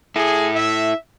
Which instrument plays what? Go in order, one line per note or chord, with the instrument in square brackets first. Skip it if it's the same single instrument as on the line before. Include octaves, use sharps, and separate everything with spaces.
[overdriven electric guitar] E4 A4 [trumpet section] G#4
[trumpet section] E5